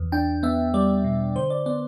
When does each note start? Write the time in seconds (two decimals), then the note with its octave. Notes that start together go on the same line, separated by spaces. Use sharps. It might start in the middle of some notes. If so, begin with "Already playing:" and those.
Already playing: E2
0.12 D4 G5
0.43 B3 E5
0.74 G3 D5
1.04 B2
1.36 D3 C5
1.50 D5
1.66 B3 D5